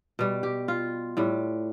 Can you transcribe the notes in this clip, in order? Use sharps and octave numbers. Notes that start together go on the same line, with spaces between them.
B2 G3
G4
F4
A2 G3